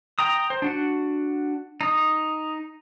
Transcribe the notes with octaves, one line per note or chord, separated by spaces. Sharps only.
G5 A#5 D#6
C5
D4 F#4 F#5
D#4 D#6